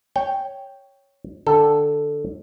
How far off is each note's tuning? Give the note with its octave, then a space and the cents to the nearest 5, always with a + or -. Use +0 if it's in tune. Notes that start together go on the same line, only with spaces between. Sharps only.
C#5 +0 G5 +0
D3 +0 A4 +0 G5 -10